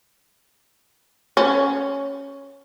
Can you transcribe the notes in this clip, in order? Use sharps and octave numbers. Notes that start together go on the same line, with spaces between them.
C#4